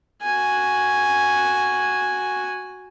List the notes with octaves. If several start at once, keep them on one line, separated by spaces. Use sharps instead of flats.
F#4 G#5